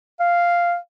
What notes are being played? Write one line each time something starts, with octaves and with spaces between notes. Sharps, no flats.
F5